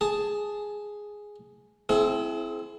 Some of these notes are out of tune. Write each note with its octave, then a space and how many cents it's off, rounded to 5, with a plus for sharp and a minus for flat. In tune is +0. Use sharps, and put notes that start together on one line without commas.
G#4 +0 A5 -10
C4 -5 E4 +15 G#4 +35